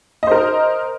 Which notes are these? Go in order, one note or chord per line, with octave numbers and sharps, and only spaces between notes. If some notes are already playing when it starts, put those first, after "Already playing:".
A#4 C5 D#5